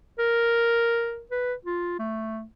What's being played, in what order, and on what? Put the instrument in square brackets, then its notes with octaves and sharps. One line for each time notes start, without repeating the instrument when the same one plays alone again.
[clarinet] A#4
B4
F4
A3